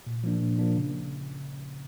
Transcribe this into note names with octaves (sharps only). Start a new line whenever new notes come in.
A#2
F3 A#3 D4
A#2
F3 A#3 D4
C#3